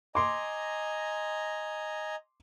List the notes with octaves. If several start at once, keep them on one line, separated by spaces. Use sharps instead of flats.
D#5 G#5 A#5 C6 D6